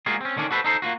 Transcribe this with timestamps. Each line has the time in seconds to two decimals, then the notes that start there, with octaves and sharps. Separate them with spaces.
0.06 G#3 A#3 F4 F#4 G#4
0.21 C4 C#4
0.37 D3 D#3 C#4 D4
0.51 F#4 A4 B4 C5
0.64 D#4 A4 C5
0.82 A#3 B3 F4 F#4